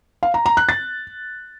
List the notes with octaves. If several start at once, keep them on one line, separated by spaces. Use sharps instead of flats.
F5
A#5
A#5
F#6
A6